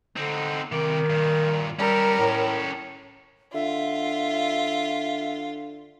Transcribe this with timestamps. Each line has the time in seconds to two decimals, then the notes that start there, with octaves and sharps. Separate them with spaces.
0.17 D3 C4 D#4
0.72 C3 D#3 D5
1.10 G2 A#2
1.79 G3 C#4 A4 A#4
2.19 A2
3.54 D3 F4 E5